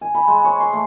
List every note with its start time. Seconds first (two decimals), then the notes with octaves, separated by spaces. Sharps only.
0.01 G#5
0.15 B5
0.28 G#3
0.44 C#5
0.60 C6
0.73 A3